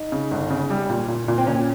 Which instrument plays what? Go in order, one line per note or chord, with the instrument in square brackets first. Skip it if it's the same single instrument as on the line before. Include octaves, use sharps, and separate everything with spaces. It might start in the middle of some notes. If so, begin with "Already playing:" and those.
Already playing: [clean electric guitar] D#4
[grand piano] C#3
G1
C#3
G3
A#2
A#2
A#2
[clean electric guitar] C4
[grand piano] A#2 [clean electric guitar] C#4